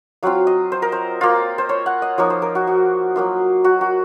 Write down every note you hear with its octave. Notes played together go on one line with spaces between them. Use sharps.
F#3 C4 F4 F5
D#5
C5
A#4
C5
A#3 F4
C5
C#5
F#5
D#5
F3 A#3 D#4 C#5
C5
A#4
F#4
F#4
F#3 A#3 F4
F#4
F#4